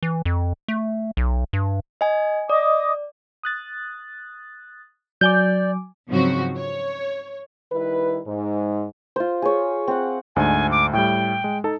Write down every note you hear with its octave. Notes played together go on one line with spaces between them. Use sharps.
E3
F2
A3
B1
G2
D#5 G#5
D5 D#5 D6 D#6
D#6 F#6 A6
F#3 D5 G#5 D6 G6
G#2 C#3 F3 F#3 C4 F#4
C#5
D#3 G3 E4 B4
G#2
F4 C5
G#4 C#5
C4 F#5
D2 G#2 D4 G#5
D6
A2 G3 G5
G#3
D#4 A4 A5